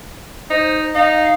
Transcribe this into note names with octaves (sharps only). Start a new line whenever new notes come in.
D#4 C5
D#4 F5